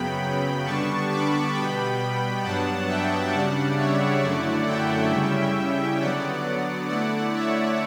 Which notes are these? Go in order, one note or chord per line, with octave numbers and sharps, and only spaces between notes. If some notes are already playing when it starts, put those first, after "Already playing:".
Already playing: F#2 C#3 F#3 B3 G5 B5
D3 G3 B3 D4 A5 C#6
B5 D6
B2 G3 B3 G5 B5
G2 F#3 B3 D4 F#5 A5
E5 G5
C#3 G3 D4 D5 F#5
C#5 E5
F#2 D3 F#3 A3 E4 D5 F#5
E5 G5
C#3 G3 C#4 E4
D3 F#3 B3 D5 F#5
D3 A3 E4 D5 F#5
C#5 E5